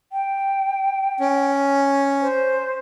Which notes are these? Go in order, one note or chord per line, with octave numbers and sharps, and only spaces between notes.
G5
C#4
C5